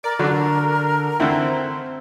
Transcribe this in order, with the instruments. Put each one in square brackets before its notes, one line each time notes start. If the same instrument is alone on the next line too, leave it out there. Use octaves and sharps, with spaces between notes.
[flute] A#4 [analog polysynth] D5
[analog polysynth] D3 [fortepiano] F#3 D4
[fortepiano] D3 A3 E4 [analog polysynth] C4